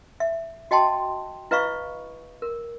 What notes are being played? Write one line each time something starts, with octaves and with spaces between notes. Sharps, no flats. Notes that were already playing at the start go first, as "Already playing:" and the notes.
E5
F#4 D#5 G5 A5 C6
E4 B4 D#5 F5 B5 C#6
A#4